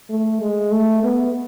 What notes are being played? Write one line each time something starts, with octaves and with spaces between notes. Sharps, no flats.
A3
G#3
A3
B3